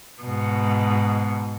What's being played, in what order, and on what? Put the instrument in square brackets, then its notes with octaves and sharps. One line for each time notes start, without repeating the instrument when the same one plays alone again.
[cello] G#2 B2